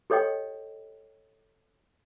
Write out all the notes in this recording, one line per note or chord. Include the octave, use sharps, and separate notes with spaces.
G4 A4 C#5 D#5 G5